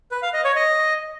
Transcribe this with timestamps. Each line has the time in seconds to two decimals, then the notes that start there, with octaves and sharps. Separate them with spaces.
0.11 B4
0.22 F5
0.33 D#5
0.45 C#5
0.56 D#5